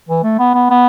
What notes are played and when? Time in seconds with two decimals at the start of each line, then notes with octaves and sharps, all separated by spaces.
0.08 E3
0.23 A3
0.39 B3
0.54 B3
0.70 B3